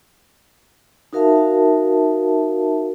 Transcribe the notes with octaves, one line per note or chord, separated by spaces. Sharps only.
D#4 F#4 A#4 E5 F5 A5